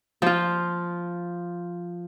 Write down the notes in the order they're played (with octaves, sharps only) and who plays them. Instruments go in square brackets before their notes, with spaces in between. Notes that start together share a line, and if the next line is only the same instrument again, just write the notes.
[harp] F3 F4